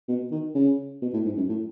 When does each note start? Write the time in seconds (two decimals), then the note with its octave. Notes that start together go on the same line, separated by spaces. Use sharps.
0.08 B2
0.31 D#3
0.55 C#3
1.02 B2
1.13 A2
1.25 G#2
1.37 F#2
1.49 A2